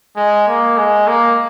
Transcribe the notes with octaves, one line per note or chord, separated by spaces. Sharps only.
G#3
A#3
G#3
A#3